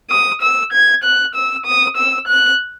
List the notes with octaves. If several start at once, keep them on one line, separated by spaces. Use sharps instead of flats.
D#6
E6
G#6
F#6
E6
D#6
E6
F#6